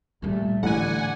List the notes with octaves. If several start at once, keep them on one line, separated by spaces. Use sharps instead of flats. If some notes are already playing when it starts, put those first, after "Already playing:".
A#2 G3 A3 A#3
A1 A2 D3 A3 F#5 G#5